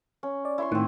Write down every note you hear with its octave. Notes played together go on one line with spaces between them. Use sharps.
C#4
D5
E4 C6 C#6
A2 D#3 C4 F#5